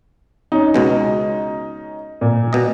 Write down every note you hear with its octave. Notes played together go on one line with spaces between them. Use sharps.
C#4 D#4
C#2 B2 G#3
A#2
B2 D#5